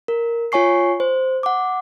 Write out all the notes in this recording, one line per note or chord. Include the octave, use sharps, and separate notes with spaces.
A#4
F4 C#5 G#5 C#6 C7
C5
F#5 D6